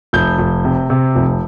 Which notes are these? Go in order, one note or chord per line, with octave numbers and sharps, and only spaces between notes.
F1 G6
F1
C3
C3
F1